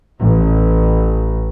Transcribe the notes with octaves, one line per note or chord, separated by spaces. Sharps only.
A1